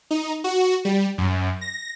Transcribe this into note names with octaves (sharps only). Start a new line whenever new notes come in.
D#4
F#4
G3
F#2
A#6